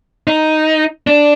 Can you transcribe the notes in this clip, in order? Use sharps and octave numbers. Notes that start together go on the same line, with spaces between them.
D#4
D4